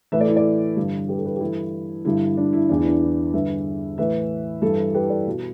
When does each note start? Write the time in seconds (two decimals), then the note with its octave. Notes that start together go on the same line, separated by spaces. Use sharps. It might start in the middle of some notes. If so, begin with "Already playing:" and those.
0.12 A2 E3 B4 E5
0.21 A4 D5
0.28 E4
0.37 A4 D5
0.77 G2 D3
1.09 G4 B4
1.18 A4
1.25 G4 B4
1.36 G4
1.41 G2 E3 E4 A4
2.05 G2 D3 E4
2.37 D4
2.53 E4
2.69 E2 E3 D4
2.78 E4
2.87 D4
3.02 E4
3.33 G2 D3 B4 E5
3.98 A2 E3 B4 E5
4.62 G2 E3 E4 A4
4.94 G4 B4
5.10 A4 D5
5.27 B2